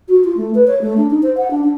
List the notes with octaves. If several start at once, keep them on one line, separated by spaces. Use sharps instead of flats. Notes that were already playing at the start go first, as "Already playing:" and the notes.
F#4
F4
A3
B4
C#5
A3
D4
D#4
C5
F#5
D4
D4